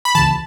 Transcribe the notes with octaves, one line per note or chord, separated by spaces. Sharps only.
B5
C#2 C#3 E3 A5